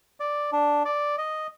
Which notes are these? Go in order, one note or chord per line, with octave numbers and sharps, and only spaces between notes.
D5
D4
D5
D#5